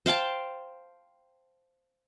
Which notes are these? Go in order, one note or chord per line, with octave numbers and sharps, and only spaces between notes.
C5 F5 G5 A5